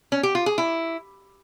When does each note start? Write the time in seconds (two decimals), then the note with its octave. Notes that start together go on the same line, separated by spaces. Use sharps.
0.12 C#4
0.23 G4
0.35 F4
0.46 G#4
0.58 E4